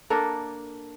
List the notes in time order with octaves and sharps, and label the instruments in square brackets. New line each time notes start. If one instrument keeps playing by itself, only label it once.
[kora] A#3 D4 A4 A#4